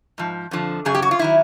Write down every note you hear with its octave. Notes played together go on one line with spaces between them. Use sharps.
G#2 F3
F2 D3 F3
F#2 C#3 F#3 G#4
G4
F#4
F4
D#3 F#3 E4